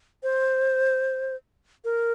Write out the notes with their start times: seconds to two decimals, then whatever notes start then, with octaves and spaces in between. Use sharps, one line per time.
0.23 C5
1.84 A#4